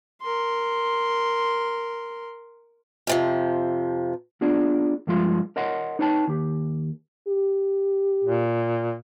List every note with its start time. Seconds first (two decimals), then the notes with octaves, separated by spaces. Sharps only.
0.22 A#4 C6
3.07 F2 C3 F3
4.41 B3 D4 F4 G#4 D5
5.07 G2 F3 G#3 F4 C6
5.56 A#4 C#5 D#5 F#5 C6
5.99 D#4 B4 C#5 G5 A5
6.28 D#2 G4
7.28 G4
8.24 A#2